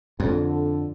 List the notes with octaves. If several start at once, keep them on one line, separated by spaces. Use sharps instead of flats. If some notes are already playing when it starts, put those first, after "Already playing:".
F2 D3